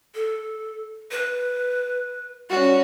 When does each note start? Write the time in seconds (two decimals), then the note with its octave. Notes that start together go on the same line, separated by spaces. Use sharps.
0.15 A4
1.11 B4
2.50 G3 C#4 F#4